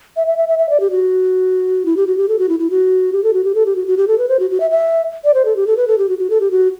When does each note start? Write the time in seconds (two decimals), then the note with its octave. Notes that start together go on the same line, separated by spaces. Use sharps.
0.16 E5
0.27 E5
0.38 E5
0.48 E5
0.59 E5
0.69 D5
0.80 G4
0.91 F#4
1.86 E4
1.97 G4
2.07 F#4
2.17 G4
2.29 A4
2.39 F#4
2.49 E4
2.59 E4
2.70 F#4
3.13 G4
3.24 A4
3.33 F#4
3.44 G4
3.55 A4
3.66 G4
3.76 F#4
3.87 F#4
3.97 G4
4.08 A4
4.18 B4
4.29 C5
4.39 F#4
4.51 F#4
4.60 E5
4.71 E5
5.24 D5
5.34 C5
5.45 A4
5.56 G4
5.67 A4
5.77 B4
5.88 A4
5.98 G4
6.09 F#4
6.19 F#4
6.30 A4
6.41 G4
6.51 F#4